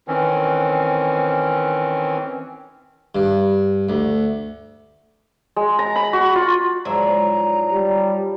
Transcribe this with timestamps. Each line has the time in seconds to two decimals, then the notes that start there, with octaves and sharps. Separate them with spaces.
0.08 D#3 E3 C4 C#4
3.15 G2
3.89 D2
5.56 G#3
5.79 A#5
5.96 B5
6.13 F#4
6.35 F4
6.85 G#2 F3 F#3 D4 E4 A#5
7.72 G3